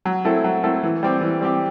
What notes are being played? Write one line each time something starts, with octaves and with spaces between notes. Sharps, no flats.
F#3
A3 C4 E4 A4
F#3
A3 C4 E4 A4
E3
G3 C4 G4
E3
G3 C4 G4